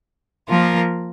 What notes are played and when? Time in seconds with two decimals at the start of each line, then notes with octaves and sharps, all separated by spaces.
0.49 F3 A#3 F4 A#4